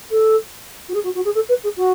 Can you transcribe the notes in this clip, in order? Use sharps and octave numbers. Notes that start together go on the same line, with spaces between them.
A4
F#4
G#4
F#4
F#4
G#4
A4
B4
G#4
F#4